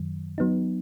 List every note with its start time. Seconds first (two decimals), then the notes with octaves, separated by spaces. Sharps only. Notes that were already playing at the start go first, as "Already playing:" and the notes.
Already playing: F#2 D#3 F#3
0.38 F#3 B3 D#4